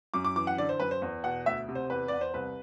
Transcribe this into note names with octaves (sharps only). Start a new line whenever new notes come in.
F#2 D6
D6
E3 D6
F#5
D3 D5
C5
F#2 B4
C5
E2
B2 F#5
D2 E5
C3
C5
E2 B4
E2 D5
C5
C2 B4